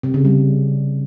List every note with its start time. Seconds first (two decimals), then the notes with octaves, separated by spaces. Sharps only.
0.03 C3
0.14 C#3
0.25 G3